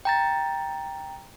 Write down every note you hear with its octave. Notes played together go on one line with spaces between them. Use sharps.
G5 A#5 A6